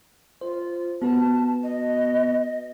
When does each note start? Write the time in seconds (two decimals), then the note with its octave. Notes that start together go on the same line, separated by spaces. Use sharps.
0.41 F4 C5
1.02 B3 F#4 B4 A5
1.63 D#5